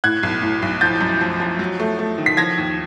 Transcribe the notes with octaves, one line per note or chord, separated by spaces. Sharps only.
A2 F#6 G#6
B1
A2
B1
F3 G6 A6
F#2
F3
F3
F#3
A3
A3
D#3
B6
F3 G#6 A#6
D#2